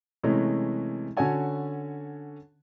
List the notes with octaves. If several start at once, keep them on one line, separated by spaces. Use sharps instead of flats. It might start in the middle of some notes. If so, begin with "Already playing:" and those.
C3 E3 G#3 A3 C#4
D3 C#4 F#4 C#5 G#5 A5